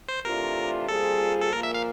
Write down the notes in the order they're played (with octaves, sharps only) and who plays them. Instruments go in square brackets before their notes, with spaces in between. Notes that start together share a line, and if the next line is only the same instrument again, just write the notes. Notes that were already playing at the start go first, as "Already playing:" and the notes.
[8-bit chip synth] C5
[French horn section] C3 E3 A3 D4 F4 [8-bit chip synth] A#4
[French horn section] A#2 G3 C4 F4 G#4 [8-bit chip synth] A4
[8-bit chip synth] A4
[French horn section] A#2 F3 A#3 [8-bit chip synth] A#4
[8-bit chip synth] E5
F5